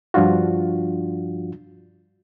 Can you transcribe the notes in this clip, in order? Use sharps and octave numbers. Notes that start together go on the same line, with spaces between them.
G2 F3 D4 F4 F#4